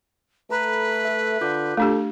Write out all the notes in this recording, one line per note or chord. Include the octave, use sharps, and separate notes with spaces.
A3 A4 B4 A#5 B5
A4 E5
D3 F4 D6 G6
A3 D4 G4 A4